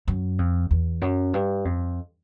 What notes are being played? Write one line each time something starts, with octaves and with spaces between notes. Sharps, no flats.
F#2
F2
E2
F#2
G2
F2